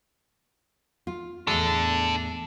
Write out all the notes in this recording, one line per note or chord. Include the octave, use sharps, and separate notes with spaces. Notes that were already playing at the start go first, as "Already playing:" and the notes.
F4
E2 A2 D4 G#4 A4